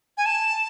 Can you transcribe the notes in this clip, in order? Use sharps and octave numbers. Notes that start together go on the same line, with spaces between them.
G#5
A5